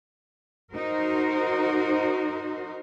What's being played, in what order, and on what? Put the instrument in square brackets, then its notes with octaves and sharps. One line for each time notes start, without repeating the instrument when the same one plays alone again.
[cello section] D#4 F#4 A#4 C5